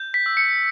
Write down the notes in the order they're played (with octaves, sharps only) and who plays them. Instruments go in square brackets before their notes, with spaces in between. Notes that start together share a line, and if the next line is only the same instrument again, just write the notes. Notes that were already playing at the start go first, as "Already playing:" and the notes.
Already playing: [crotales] G6
B6
E6
C#7